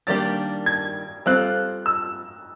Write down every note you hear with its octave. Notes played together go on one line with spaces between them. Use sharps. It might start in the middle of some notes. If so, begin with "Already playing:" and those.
D#3 G3 A#3 D4 G4 A6
G#6
G3 C4 F4 A4 F#6
E6